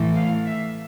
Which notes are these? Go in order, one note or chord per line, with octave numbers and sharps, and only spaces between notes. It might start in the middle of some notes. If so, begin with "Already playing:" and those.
Already playing: A2 E3 A3
F5
E5